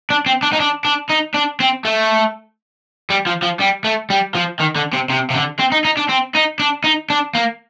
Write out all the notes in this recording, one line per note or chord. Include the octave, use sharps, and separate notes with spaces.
D4
C4
D4
D#4
D4
D4
D#4
D4
C4
A3
G3
F3
F3
G3
A3
G3
F3
D#3
D3
C3
C3
C3
D3
C4
D#4
D#4
D4
C4
D#4
D4
D#4
D4
A#3